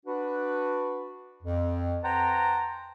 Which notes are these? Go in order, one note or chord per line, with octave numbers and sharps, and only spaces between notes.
D4 F#4 B4
F2
B4 C5 F#5 G5 A5 A#5